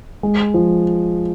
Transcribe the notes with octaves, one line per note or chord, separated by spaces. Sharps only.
G#3
F3